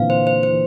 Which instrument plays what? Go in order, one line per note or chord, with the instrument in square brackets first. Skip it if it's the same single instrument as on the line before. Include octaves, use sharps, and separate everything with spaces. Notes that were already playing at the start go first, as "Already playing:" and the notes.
Already playing: [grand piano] A#2 D3 E3 C4 [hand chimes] F5
[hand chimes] C5
C5
C5
[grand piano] E3